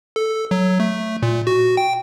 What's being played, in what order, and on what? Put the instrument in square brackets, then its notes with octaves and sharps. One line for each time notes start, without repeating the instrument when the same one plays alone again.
[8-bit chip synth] A4
F#3
A3
A#2
F#4
G5